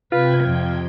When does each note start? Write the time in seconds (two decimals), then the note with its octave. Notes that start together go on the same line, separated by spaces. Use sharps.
0.12 C3 F4 B4 G5 G#6
0.44 F2